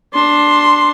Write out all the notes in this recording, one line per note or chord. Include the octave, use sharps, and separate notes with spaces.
D4 C6